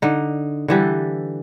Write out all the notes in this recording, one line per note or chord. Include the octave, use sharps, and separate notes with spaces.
D3 D#4
D3 E3 G3 A4